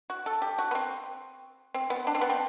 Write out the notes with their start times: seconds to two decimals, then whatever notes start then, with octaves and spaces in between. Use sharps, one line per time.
0.10 F#4
0.26 A4
0.42 G4
0.59 F#4
0.71 B3
0.75 C4
1.74 C4
1.90 B3
2.07 D4
2.15 C4
2.21 B3
2.30 C4